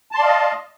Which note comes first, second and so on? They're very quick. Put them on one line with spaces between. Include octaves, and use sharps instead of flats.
A5 C6 D5 F5 D#5